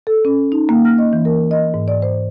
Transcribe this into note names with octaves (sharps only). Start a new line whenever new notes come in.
A4
C#4
D#4
A#3
F6
D#5
E3
A#4
D#5
G#2
D5
C5